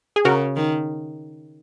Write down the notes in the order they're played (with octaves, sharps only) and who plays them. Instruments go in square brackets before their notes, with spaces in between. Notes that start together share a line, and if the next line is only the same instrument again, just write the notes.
[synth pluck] G#4
[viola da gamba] C#3 [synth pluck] F#4 A#4
[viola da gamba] D#3